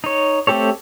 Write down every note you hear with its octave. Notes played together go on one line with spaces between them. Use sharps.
D#4 C#5
A3 C4 G4 A4 C#5